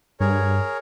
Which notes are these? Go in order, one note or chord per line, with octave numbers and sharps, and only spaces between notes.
G2 G#4 A#4 C#5